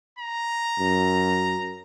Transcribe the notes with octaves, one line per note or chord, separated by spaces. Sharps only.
A#5
F#2